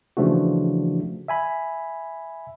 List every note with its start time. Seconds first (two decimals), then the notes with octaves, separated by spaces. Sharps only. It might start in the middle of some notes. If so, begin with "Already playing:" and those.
0.17 C#3 E3 F3 A3 D4 F#4
1.28 E5 G#5 B5